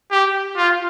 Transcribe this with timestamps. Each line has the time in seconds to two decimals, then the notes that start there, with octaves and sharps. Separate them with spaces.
0.11 G4
0.57 F4